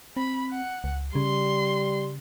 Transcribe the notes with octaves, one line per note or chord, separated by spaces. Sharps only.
C4 B5
F#5
C#2
C#3 G3 C6